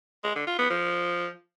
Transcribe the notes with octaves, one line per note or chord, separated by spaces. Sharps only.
G#3
D3
F4
B3
F3